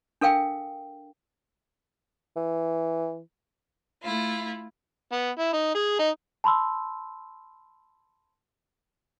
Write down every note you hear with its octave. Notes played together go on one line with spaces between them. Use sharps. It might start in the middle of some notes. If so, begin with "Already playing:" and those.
D4 A4 A#4 F5 G5
E3
A3 E4 F4
B3
E4
D#4
G#4
D#4
A5 B5 C6 E6